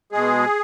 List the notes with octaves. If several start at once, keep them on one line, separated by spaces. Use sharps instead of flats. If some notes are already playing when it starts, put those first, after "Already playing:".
B2 G#3 G#4